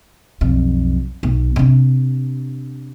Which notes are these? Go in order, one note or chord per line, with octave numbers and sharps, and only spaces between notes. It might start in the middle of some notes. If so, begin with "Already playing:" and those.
B1 F2
B1
C3 D4